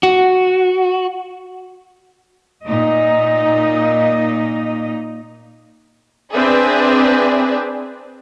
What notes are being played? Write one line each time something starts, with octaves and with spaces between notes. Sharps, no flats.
F#4
A#2 D#4 D#5
C4 D4 G#4 B4 D5 E5